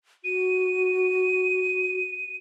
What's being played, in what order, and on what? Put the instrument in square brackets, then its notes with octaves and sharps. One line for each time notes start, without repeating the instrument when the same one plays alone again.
[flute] F#4 [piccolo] D#7